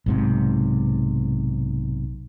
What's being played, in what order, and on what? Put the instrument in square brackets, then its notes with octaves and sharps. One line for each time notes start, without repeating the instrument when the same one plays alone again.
[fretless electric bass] B1 G#2 C3